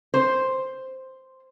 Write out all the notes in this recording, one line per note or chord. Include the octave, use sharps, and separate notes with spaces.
C5